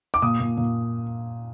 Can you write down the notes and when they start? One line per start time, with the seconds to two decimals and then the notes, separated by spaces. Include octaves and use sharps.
0.14 D6
0.22 A#2 D#6
0.40 A#2
0.58 A#2